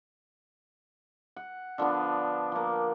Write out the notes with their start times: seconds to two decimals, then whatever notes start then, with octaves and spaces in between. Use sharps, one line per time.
1.36 F#5
1.78 D3 F3 B3 D4
2.52 F3 A#3